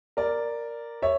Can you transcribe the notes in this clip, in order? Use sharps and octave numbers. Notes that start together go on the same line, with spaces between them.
A#4 D5
C#5 E5